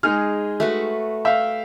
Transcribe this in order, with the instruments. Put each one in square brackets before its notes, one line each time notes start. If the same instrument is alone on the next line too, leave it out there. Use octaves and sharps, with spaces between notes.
[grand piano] G#3 D#4 F6 [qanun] G#4
[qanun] A3 F#4 B4
[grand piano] E5 F5 [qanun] G5